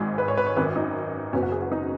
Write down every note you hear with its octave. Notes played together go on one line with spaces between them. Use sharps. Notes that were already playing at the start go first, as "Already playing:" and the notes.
Already playing: G#1 G#2 D#3 G#3
B4
C#5
B4
C#5
G#1 F#2 D#3 B4
D#4
F#1 F#2 F#3 B3 C#4
F#4
G#4
F#4
D#4